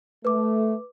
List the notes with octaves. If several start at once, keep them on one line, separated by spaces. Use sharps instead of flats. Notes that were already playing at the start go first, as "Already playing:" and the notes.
A3 B4 D6